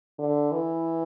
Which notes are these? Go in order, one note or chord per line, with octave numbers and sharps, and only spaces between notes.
D3
E3